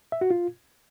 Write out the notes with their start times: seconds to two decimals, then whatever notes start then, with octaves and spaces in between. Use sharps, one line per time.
0.12 E5
0.21 F#4
0.31 F4